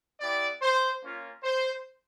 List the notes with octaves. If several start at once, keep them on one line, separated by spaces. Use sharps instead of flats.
B3 E4 G4 D5
C5
A#3 C#4 F4
C5